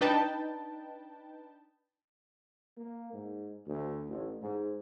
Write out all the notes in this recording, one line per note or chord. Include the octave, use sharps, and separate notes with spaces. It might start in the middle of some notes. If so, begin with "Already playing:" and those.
D4 D#4 B4 G5 A5
A#3
G#2
D2
A1
G#2